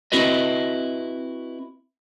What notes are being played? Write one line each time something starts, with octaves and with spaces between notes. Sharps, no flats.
C4 E4 F#4 B4 D#5